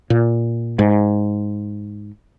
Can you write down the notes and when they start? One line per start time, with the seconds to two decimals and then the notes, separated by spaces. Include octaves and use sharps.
0.10 A#2
0.79 G#2